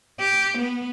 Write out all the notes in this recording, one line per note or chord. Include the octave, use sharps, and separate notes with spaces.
G4
B3